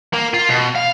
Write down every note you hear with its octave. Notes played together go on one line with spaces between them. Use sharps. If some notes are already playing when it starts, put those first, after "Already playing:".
A#3
F4
B2
F5